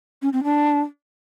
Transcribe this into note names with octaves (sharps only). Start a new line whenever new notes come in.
C#4
C4
D4